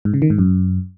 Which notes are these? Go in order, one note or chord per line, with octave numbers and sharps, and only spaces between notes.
G#2
C#3
D#3
G#2
F#2